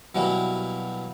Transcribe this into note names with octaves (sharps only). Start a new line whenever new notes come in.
B2 E3 F#3 G3 A#3